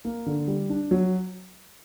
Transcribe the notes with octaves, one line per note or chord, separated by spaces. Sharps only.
A#3
D3
G3
D4
F#3